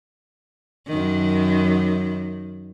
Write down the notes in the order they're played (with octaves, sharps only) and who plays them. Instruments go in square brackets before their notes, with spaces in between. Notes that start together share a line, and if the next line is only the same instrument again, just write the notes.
[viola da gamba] F#2 D#3